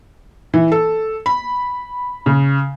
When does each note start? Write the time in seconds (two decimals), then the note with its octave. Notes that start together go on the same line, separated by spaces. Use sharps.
0.54 E3
0.72 A4
1.26 B5
2.26 C#3